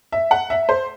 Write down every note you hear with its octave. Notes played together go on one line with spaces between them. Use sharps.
E5
F#5
E5
C5